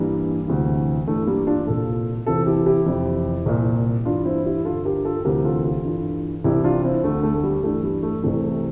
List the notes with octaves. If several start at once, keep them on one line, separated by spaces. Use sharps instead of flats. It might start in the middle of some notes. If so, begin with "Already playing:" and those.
Already playing: G2 E3 G3 A#3
D2 C3 E3
G2 E3 A3
G3 A#3
D4 F4
C2 A#2 F4 A4
E2 C3 E3 F4 A4
E4 G4
E4 G4
F2 C3 E3
C2 A#2
G2 E3 D4 F4
C4 E4
E4 G4
G2 D3 F4 A4
G4 A#4
F4 A4
D2 C3 E3 G4 A#4
F4 A4
F4 A4
G2 E3
C2 C3 E3 E4 G4
D4 F4
C4 E4
D2 D3 A3
A3
A3
G3
G2 E3 A3
G3
A3
C2 C3 E3 A3
A3